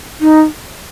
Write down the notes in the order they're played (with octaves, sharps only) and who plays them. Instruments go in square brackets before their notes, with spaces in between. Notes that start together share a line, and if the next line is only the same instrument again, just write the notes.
[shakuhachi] D#4